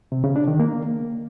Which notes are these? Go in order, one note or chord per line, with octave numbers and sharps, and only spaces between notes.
C3
C#3
D4
D#3
A#3